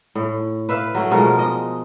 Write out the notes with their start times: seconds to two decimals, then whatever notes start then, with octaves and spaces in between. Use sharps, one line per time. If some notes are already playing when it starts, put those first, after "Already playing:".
0.15 A2
0.69 B4 E5 F5
0.95 F#3 A3
1.11 B2 F3 G#3 A#4
1.39 D#5